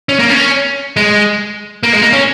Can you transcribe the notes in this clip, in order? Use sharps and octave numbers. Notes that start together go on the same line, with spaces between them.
C#4
A#3
C#4
G#3
A#3
G#3
A#3
C#4